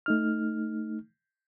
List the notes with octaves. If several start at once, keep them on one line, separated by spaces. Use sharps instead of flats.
A3 D#4 F6